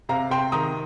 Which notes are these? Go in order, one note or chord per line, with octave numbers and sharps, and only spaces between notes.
C3 F5 A#5
C3 G5 C6
D#3 A#5 D#6